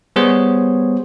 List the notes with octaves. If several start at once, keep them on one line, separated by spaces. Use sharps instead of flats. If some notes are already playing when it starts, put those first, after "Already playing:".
G3 B3 G#4 C5 C#5